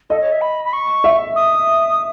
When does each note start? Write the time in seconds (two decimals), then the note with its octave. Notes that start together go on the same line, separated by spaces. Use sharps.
0.10 A4 D#5
0.21 C#5
0.32 E5
0.41 B5
0.65 B5
0.73 C#6
1.04 E5
1.36 D#6